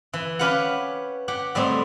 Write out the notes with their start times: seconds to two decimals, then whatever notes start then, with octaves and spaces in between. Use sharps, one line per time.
0.13 E3
0.39 C#4 G4 B4 F5 F#5
1.28 G4 F#5
1.55 A2 G3 G#3 C4